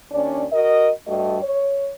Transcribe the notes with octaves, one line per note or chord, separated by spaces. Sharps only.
D#2 C#4 D4 D5
F#4 A#4 D#5
G2 G3 A3 F#4 D#5
C#5